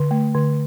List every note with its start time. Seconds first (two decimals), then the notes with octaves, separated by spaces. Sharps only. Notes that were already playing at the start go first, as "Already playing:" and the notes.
Already playing: D3
0.11 A3
0.35 D3